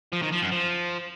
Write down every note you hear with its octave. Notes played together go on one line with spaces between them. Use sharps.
F3
D#3
F3
F#2
F3